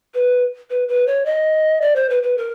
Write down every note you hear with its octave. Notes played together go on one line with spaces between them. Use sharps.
B4
B4
B4
C#5
D#5
D5
C5
B4
B4
A#4